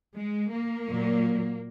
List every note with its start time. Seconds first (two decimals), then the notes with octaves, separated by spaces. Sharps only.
0.16 G#3
0.51 A#3
0.88 A#2 F#3